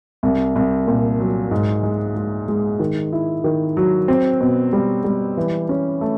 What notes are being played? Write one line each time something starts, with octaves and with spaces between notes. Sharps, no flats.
C2
C2
A#2
F#3
G#2
G#3
G#3
G#3
D#3
E4
D#3
F#3
C4
B2
G3
G3
E3
C#4
A3